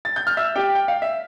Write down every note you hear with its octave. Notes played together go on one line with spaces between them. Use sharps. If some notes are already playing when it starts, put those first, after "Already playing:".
A6
G6
F6
E5 E6
G4 G5
G5
F5
E5